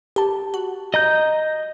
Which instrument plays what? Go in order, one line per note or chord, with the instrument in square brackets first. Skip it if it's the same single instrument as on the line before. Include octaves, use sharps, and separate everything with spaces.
[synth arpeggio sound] G4 A5
F#4
[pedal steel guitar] D#5 A#5 G6